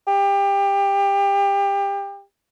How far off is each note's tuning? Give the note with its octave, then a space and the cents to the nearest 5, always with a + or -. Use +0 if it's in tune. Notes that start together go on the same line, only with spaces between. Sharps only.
G4 +25